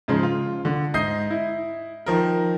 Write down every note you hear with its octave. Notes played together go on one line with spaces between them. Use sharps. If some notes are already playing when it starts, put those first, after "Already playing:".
G#2 C#3 F3 G#3
F4
D3
G#2 D#5 D#6 G6 C7
E4
D#3 F3 A#4